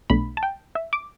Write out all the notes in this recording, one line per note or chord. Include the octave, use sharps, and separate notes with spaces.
B1 B2 A3 D4 B5
A5
G5
E5
D6